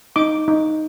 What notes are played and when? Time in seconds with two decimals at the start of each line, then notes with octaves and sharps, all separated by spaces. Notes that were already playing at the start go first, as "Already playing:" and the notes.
0.16 D#4 D6
0.48 D#4